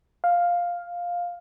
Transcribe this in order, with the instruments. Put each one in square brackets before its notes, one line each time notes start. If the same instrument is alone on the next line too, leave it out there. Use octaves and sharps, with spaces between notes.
[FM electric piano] F5